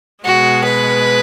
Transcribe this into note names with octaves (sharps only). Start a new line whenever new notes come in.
B2 G#3 F#4
B4